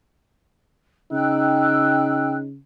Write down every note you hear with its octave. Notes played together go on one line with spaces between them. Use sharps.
C#3 D#4 G5 E6 F#6